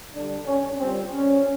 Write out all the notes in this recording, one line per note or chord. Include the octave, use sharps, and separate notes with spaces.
D3 G3 D4
C#4
A#2 G3 C4
C#4